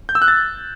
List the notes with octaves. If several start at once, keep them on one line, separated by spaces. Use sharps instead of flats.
G6
E6
F#6
A6